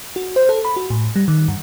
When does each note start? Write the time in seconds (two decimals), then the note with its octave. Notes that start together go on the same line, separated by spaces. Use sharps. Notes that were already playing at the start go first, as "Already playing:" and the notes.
0.16 F#4
0.36 C5
0.49 A4
0.65 B5
0.76 F#4
0.90 A2
1.16 G3
1.28 D#3
1.48 G2